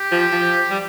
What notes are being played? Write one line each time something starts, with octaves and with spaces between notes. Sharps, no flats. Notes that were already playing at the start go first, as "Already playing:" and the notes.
Already playing: G4
F3
F3
G3